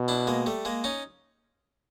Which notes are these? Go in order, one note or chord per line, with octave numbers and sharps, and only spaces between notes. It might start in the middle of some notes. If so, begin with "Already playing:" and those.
Already playing: B2
D4 E4
G#3 A#3
G3 A3
G#3 A#3
C#4 D#4